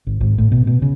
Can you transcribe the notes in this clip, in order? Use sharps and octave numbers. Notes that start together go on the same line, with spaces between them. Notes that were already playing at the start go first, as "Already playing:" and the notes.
G#1
G#1
A2
B2
B2
C#3